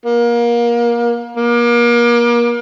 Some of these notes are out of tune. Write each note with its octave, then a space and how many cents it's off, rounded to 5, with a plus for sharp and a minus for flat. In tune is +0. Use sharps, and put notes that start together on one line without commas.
A#3 +25
A#3 +35